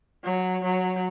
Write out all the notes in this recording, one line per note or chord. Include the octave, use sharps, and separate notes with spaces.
F#3
F#3